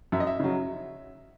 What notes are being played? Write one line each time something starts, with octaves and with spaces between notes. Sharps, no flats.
F#2 E5
D#5
E5
C#3 F#3